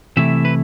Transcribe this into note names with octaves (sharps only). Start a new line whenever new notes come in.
C3 E3 A3 E4 E5
B4